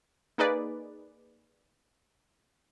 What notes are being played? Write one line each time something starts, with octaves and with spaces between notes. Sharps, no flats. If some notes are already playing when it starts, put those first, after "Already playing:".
A#3 D#4 G#4 B4 D5